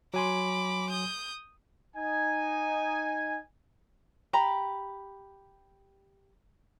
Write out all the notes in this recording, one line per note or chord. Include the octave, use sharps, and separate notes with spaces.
F#3 G#5 B5 C6 D6
D#6 G6
D#4 G#5
G4 A#5 B5